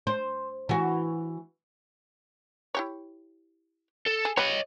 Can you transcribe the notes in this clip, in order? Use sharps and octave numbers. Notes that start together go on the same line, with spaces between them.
C5
E3 F#4
E4 G4 C#5
A4
G#4
G3 B3 B4 C#5 D#5